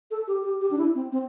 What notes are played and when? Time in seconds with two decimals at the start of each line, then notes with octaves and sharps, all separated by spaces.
0.11 A4
0.28 G4
0.44 G4
0.61 G4
0.71 D4
0.78 E4
0.95 C4
1.12 C4